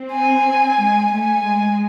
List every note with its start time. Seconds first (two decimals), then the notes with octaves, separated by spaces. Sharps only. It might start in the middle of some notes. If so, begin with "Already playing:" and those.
Already playing: C4
0.12 G#5
0.79 G#3
1.12 A3 G#5
1.46 G#3